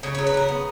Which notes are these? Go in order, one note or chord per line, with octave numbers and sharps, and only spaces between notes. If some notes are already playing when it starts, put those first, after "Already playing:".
C#3 C#5
C#5
F#3
B4
C#3 A#4
B3